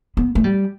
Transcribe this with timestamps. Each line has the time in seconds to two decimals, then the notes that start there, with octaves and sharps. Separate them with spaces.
0.17 B3
0.35 A3
0.44 G3